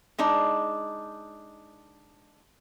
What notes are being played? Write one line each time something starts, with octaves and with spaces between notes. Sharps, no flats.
G#3 D4 D#4